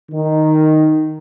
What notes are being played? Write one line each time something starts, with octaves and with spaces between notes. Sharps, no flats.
D#3